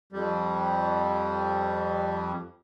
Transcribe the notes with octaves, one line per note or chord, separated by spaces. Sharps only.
F2 G3